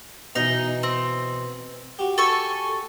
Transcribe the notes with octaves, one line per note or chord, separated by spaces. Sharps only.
B2 E3 D#4
C4
F#4 G4
A4 G#5 C#6